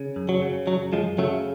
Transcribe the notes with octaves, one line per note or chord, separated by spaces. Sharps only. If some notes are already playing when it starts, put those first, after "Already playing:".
Already playing: C#3
F#2
F#3
C#3
F#2 F#3
F#2 F3 G#3
C#3 F#3 A3